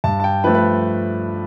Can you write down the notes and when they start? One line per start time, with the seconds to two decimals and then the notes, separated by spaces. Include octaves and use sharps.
0.04 G2 A5
0.20 A5
0.24 G5
0.44 F3 A3 B4
0.55 B4